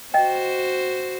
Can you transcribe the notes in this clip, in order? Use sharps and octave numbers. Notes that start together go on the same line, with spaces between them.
F#4 C5 D#5 G5